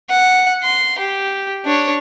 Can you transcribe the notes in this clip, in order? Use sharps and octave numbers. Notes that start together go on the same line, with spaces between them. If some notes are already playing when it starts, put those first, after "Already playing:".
F#5
C6
G4
D4 C#5